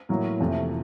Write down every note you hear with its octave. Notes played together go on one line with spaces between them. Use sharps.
A2 F#3 A#3
F2 C3 E3 A3